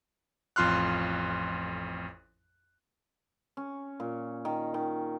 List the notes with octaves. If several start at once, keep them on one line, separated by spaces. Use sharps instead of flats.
A1 F2 F4 C6 F6 F#6
C#4
A#2
D#3
D#3